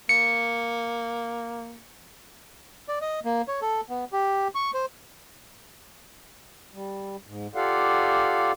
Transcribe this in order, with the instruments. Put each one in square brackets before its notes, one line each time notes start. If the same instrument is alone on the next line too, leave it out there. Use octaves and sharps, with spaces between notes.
[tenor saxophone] A#3 [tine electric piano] C#7
[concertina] D5
D#5
A#3
C#5
A4
B3
G4
C#6
C5
[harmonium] G3
G#2
F4 G4 A4 D5 F5 F#5